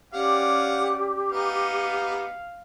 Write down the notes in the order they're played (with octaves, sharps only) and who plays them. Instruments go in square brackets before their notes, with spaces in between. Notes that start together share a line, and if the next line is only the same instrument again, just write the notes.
[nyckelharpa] C#4 D5 [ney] G4 [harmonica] F5 F#5
[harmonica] B3 D#4 [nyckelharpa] F5